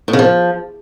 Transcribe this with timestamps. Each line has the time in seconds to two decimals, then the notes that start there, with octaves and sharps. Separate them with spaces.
0.08 A2
0.13 C#3
0.19 F3